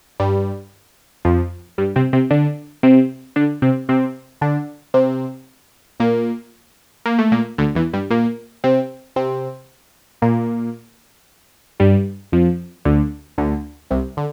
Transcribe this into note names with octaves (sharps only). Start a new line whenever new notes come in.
G2 G3
F2 F3
G2 G3
C3 C4
C3 C4
D3 D4
C3 C4
D3 D4
C3 C4
C3 C4
D3 D4
C3 C4
A#2 A#3
A#3
A3
A#2 A#3
D2 D3
E2 E3
G2 G3
A#2 A#3
C3 C4
C3 C4
A#2 A#3
G2 G3
F2 F3
D2 D3
D2 D3
C2 C3
D3